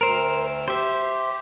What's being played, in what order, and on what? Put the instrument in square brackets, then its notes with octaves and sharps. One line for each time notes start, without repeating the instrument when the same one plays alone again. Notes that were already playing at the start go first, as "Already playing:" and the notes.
[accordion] D2 E6 [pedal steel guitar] A#4 C5
[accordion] G4 [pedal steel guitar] C5 E5